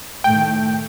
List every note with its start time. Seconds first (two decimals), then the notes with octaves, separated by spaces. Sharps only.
0.24 A2 D#3 A3 G5